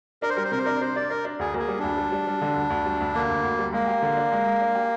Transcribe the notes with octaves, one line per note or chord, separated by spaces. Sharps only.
D4 A#4
C5
G3 A#4
C5
C3 A#4
C5
D4 A#4
D4 C5
D4 D5
D4 A#4
D4
D2 G#4
A#3 G#4
G3
D2 D4
G3
G3
G3
D3
D2
D2
G3
D2
D3 A#3
D2
D2
G3
G#3 A#3
G4
D3
D4
G#3
G#3
D4
G4